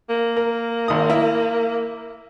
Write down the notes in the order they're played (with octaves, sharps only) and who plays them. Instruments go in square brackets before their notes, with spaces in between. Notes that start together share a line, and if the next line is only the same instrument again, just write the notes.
[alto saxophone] A#3
[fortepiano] A#4
G#1 D#6
E4 A#4